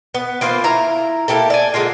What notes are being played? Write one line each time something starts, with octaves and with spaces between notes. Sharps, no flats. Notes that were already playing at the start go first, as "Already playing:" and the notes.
B3
E3 A#3 F4 C5
E4 A#5
A#3 E4 G4 A4
D5 G#5
D3 G#3 A#3 F4